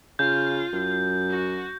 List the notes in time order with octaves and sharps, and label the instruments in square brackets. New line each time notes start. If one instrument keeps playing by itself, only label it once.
[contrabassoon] C#3 [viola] F4 [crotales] G6
[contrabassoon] F#2
[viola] F#4